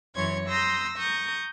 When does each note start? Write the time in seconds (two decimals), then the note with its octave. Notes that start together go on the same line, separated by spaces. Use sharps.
0.15 F#2 E3 C#5 C6 C#6 G#6
0.49 A#5 C6 D#6 E6 G6 A#6
0.97 A#5 C#6 D#6 G6